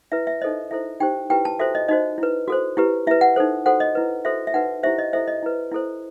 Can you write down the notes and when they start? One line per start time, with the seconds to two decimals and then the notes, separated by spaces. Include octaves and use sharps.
0.12 E4 B4 E5
0.27 E5
0.41 D#4 A4 C5 D#5
0.71 E4 A4 C5 E5
1.00 D#4 G4 C5 G5
1.30 E4 G4 B4 G5
1.45 A5
1.59 F#4 A4 C5 E5
1.75 D#5
1.88 D#4 F#4 C5 D#5
2.18 E4 B4
2.48 F#4 A4 C5
2.77 E4 G4 B4
3.07 E4 B4 E5
3.21 F#5
3.36 D#4 A4 C5
3.66 F#4 A4 C5 F#5
3.80 D#5
3.95 E4 B4
4.25 F#4 A4 C5 E5
4.47 E5
4.54 D#4 F#4 B4 F#5
4.83 E4 G4 C5 E5
4.98 D#5
5.13 E4 A4 C5 E5
5.28 D#5
5.43 E4 B4
5.71 E4 A4 C5